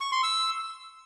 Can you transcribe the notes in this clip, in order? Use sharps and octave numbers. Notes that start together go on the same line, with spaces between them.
C#6
C6
E6